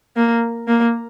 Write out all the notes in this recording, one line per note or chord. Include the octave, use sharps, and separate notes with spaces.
A#3
A#3